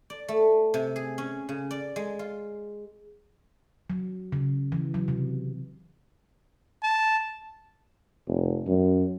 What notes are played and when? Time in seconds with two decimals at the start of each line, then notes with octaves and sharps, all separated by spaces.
0.10 D5
0.28 A3
0.74 C3
0.96 G#4
1.18 C#4
1.49 C#3
1.71 D5
1.96 G#3
2.19 F4
3.90 F#3
4.32 C#3
4.72 E3
4.94 F#3
5.08 C3
6.83 A5
8.28 F1
8.67 F#2